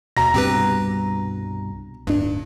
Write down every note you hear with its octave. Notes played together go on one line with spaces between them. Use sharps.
D#2 B2 A#5 A#6
C2 G2 B2 C4 G4 B4
D1 G2 D4